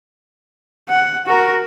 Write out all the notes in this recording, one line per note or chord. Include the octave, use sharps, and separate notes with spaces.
F#5
F#4 A#4